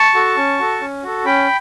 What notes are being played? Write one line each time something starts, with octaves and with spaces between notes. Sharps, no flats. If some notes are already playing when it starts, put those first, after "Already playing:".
Already playing: A5 C#6
F#4 A4
C#4
F#4 A4
C#4
F#4 A4
C#4 G5 B5